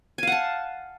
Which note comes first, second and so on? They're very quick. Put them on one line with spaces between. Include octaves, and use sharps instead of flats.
G#5 F5 F#5 A5